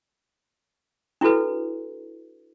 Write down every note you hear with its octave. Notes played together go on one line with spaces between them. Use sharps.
D4 E4 F#4 A4 B4